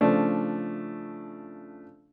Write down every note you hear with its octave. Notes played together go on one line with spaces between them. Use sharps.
C#3 F3 A3 D4